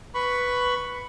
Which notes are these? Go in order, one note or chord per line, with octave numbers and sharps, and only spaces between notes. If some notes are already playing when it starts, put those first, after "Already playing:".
B4 B5 C#6